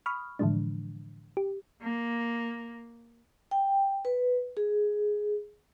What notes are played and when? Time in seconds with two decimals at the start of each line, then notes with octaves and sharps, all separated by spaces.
0.06 B5 C#6 D#6 F6
0.39 A2 D3 E3 F3 G#3 D4
1.37 G4
1.81 A#3
3.51 G5
4.05 B4
4.57 G#4